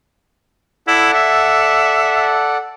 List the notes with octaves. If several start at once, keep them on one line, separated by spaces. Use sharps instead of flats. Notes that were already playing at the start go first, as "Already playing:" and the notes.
E4 A4 D5 F#5
E5